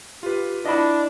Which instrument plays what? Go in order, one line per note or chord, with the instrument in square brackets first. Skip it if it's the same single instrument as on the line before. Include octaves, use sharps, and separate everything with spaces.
[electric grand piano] F4 B4 [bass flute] G4
[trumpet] D4 [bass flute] E4 [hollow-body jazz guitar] D#5 B5